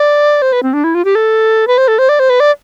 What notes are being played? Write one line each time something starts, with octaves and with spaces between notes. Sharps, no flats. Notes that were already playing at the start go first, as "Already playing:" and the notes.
Already playing: D5
C5
B4
C4
D4
E4
F4
G4
A4
B4
C5
A4
C5
D5
C5
B4
D5